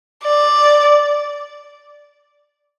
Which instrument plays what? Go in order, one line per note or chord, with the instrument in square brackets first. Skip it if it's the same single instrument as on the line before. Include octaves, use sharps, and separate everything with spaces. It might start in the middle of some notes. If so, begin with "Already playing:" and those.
[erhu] D5